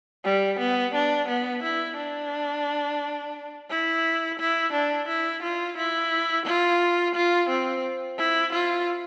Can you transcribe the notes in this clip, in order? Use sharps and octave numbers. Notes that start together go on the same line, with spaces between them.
G3
B3
D4
B3
E4
D4
E4
E4
D4
E4
F4
E4
F4
F4
C4
E4
F4